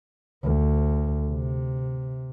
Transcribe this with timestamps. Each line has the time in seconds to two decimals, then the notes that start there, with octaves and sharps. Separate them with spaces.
0.43 D2
1.28 C3